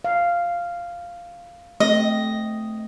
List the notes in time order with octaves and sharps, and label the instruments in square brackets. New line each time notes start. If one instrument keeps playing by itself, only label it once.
[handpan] F5
[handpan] A3 C4 [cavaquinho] D#5